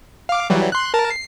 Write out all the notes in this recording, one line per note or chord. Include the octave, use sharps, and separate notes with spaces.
F5 D6
E3 F#3 G3
C6 F#6
A#4 A5
C7